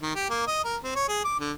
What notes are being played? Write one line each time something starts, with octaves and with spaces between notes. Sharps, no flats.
D#3
G4
A#3
D#5
A#4
C4
C#5
G#4
D6
D3